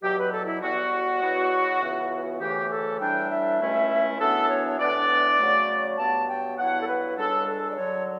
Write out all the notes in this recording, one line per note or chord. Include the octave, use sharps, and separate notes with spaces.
E2 B2 F#3 G4
B4
A4
E4
A2 G3 B3 F#4
E2 B2 F#3 B3 E4
C#2 C#3 E3 B3
D2 C#3 E3 A3 G4
A4
A2 E3 G3 D4 G5
E5
C#2 B2 A3 C#4 E4
F#2 E3 B3 D4 A4
C#5
C#5
A2 E3 B3 D4 D5
C#3 F#3 A3
G2 F#3 B3 A5
G5
G2 F#3 B3 E4 F#5
A4
B4
C#2 C#3 G3 D4 A4
A4
D5
F#2 D3 F#3 C#5